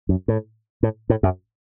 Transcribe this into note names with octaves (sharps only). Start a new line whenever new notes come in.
F#2
A2
A2
A2
F#2